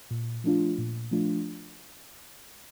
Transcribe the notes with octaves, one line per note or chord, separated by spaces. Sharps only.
A#2
F3 A3 D4 F4
A#2
F3 A3 D4 F4